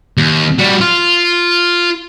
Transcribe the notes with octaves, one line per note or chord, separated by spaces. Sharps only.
D#2
G3 F#4
F4